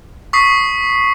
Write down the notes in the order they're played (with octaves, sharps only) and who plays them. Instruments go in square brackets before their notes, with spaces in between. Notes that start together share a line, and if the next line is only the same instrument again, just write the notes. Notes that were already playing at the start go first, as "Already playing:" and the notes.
[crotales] C#6 D#6 B6 C7